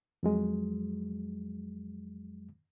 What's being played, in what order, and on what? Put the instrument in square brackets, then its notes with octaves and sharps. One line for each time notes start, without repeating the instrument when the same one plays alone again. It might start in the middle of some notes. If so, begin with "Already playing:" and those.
[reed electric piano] F2 F#3 G#3